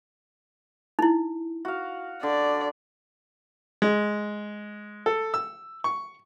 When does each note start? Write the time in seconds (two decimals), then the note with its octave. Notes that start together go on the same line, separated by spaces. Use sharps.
0.99 D#4 E4
1.65 F#4 F5
2.23 D3 D5
3.82 G#3
5.06 A4
5.34 E6
5.84 C#6